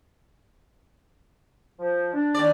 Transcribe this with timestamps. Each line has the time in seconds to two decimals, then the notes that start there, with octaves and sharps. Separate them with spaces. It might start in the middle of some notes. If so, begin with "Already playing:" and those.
1.78 F3
2.14 D4
2.35 D#2 D5